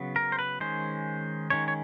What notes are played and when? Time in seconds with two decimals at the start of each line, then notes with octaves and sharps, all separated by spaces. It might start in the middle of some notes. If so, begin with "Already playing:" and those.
Already playing: C#3 F#3 B3
0.16 A#4
0.32 C5
0.39 B4
0.60 D#3 G#3 C#4 C5
1.50 D#3 G#3 C#4 C#5
1.68 C#5